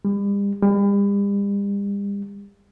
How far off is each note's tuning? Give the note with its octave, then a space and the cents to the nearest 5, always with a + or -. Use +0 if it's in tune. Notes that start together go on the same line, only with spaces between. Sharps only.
G3 +40
G3 +40